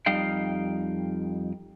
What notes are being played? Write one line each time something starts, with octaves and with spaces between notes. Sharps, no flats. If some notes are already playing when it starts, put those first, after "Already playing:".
F2 G3 D#4 F5 G5